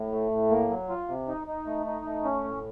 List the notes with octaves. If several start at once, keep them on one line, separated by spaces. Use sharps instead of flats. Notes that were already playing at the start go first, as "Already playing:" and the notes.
Already playing: A2
A3
A2
A#3
F#3
F4
C3
D#4
D#4
A3
D#4
A3
C#4
A2